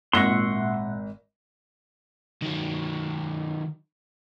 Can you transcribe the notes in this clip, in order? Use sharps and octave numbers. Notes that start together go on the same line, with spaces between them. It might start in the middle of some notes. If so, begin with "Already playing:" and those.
G#1 A#2 E5 F#5 C6 C#6 A#6
D#3 F#3